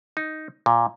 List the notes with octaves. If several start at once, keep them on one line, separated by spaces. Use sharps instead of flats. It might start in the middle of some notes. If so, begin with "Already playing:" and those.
D#4
A#2